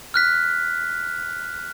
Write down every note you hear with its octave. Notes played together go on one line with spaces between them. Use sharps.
F6 F#6 B6